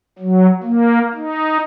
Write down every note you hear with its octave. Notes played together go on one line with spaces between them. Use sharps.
F#3
A#3
D#4